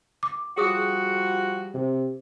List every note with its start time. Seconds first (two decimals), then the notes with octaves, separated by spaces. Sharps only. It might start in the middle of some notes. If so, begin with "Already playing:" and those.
0.23 D6
0.58 F3 G3 F#4 G#4 D#6
1.74 C3